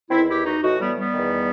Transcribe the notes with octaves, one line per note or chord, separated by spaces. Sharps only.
E2 D#3 C4 E4
E4 G4
D#4 F#4
A2 E3 D#4 F#4
G3 B3
G3 B3
E2 D#3